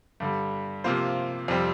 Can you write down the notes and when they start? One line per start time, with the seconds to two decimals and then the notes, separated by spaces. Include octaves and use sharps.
0.20 G2 D3 G3
0.84 C3 F3 A#3 F4 C5
1.48 F2 C3 G3 C4